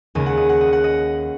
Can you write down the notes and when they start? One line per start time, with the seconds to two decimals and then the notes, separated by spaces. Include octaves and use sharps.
0.15 D#2 C#3 G#3 D#5
0.26 F#5
0.37 D#5
0.49 F#5
0.61 D#5
0.73 F#5
0.84 D#5